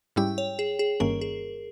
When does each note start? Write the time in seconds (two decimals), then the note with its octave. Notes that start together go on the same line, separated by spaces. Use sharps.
0.16 G#2 G3 C#4 E4 G4 G5
0.38 C#5
0.59 G#4
0.79 G#4
1.00 G1 G2 D#3 A#3 C#4 A#4
1.21 G#4